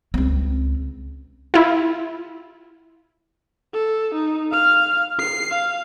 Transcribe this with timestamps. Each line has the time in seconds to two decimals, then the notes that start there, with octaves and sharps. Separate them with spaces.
0.14 C#2 C4
1.54 E4 F4
3.73 A4
4.14 D#4
4.51 F5 F6
5.19 C7
5.51 F5